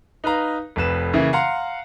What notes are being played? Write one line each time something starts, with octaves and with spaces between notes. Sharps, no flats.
D#4 B4 F5 A#5
F1 F2 B4 E7
C#3 E3 A#3 E4
F5 F#5 A#5 C6